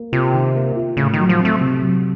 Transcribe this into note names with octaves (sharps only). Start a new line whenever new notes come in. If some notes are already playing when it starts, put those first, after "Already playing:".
Already playing: A#3
C3 F4
D#3
A#3
F4
A2 C#3
D#3 F#3
F3
C4
A3
C3
F#3